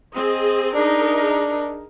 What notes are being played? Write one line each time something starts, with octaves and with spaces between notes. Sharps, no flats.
C4 G#4 D#5
D4 D#4 G#4 A#4